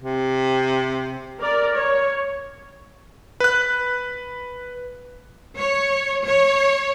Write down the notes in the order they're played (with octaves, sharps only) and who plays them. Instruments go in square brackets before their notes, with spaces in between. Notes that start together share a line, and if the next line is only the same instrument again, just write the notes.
[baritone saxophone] C3
[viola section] A#4 D5
C#5
[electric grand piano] B4 F#6
[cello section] C#5
C#5